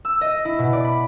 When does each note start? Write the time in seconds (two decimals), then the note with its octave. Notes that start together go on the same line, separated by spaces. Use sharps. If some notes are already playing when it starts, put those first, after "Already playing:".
0.05 E6
0.21 D#5
0.45 E4
0.59 B2
0.73 D5
0.85 B5